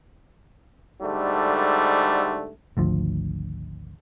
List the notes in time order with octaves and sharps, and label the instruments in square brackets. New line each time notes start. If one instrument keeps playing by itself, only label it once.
[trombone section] G#2 D3 G3 A3
[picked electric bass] G#1 D2 F3